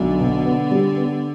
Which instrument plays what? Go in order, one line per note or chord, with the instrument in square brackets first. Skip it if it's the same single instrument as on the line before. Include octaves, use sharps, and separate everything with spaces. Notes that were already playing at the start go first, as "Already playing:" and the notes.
Already playing: [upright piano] B1 [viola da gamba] D3
[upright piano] B2
B3
G3
B3